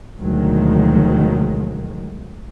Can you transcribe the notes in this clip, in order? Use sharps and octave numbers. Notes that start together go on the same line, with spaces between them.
D2 B2 D#3 F3 F#3 G#3